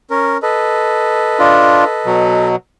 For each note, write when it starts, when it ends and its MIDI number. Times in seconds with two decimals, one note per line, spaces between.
0.10 0.37 61
0.10 0.37 70
0.43 2.48 69
0.43 2.48 71
0.43 2.48 75
1.39 1.85 62
1.39 1.85 65
2.06 2.56 47
2.06 2.56 54